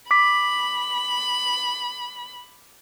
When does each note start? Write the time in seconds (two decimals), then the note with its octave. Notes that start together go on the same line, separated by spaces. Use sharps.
0.11 B5 D6 B6